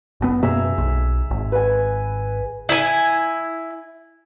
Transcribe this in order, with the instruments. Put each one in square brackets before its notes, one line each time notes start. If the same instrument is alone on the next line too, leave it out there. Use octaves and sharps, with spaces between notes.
[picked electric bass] F#1 A2 B3
[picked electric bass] F#2 B2 A#3 [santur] G#4 E5 A#5
[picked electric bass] B1
G#1
[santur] B4 G#5
[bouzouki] E4 G#5